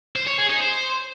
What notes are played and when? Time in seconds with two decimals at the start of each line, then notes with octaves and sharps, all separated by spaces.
0.16 C5
0.27 C#5
0.38 G#4
0.49 D#4
0.60 C5